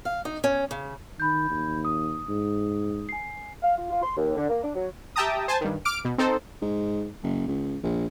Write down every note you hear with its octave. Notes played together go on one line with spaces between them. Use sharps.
F5
D#4
C#4
C#3
D#3 B5 G6
D#2
D#6
G#2
G#5 C7
F5
F4
F4
C6
D#2
D3
A#3
D4
F#3
G4 E5 G5 A5 A#5 D#6
C5 G#5 A5
G2 D#3
D6 F6 D7
B2
C4 D#4 A4 C5
G#2
F#1
C#2
A#1